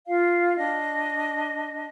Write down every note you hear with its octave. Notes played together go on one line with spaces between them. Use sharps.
F4 F5
D4 D#5